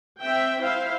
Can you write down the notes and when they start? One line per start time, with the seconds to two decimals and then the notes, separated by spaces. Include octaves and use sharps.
0.20 C4 E5 G5
0.61 E4 C5 E5 F5